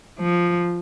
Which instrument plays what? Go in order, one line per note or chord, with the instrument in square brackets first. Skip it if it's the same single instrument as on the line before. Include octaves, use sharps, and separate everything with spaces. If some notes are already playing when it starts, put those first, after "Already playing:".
[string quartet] F3